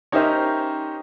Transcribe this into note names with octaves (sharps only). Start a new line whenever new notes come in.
C#4 D#4 G4 A#4 C5 E5